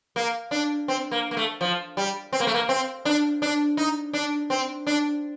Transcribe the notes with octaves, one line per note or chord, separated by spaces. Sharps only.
A#3
D4
C4
A#3
A#3
A3
F3
G3
C4
A#3
A3
A#3
C4
D4
D4
D#4
D4
C4
D4